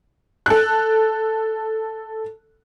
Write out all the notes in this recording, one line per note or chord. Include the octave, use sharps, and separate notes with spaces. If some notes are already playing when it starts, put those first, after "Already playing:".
A4 F#6